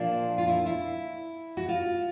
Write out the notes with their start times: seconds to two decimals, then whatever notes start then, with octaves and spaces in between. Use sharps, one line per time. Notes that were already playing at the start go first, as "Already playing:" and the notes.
Already playing: A#2 F3 A#3 D4
0.38 F4
0.48 E4
0.66 E4
1.57 F#4
1.69 F4